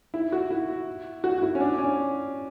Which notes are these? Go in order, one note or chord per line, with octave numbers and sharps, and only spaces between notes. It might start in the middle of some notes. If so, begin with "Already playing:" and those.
E4
F#4
E4
F#4
F#4
E4
C#4
D4
C#4